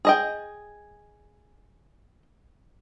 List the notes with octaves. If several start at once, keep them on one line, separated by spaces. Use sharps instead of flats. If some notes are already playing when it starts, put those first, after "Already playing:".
G#4 D#5 G5